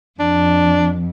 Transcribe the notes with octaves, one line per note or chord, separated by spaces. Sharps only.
F2 D4